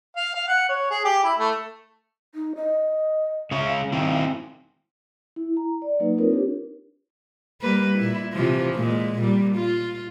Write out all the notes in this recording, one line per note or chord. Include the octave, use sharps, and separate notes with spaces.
F5
F5
F#5
C#5
G#4
G4
E4
A3
D#4
D#5
C#3 G#3 C#5 E5
F5
D#3 C4 E4
E4
A#5
D5
F#3 A#3 D#4 B4
C4 D#4 F4 A#4 B4 C#5
D4 G4
G3 A#3 B4
A#2 E4
C3 E3 F3
A#2 G#3
A#2 G3
F4